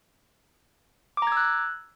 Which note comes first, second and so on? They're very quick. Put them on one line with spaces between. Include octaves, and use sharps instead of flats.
D6 A#5 G#6 E6 F#6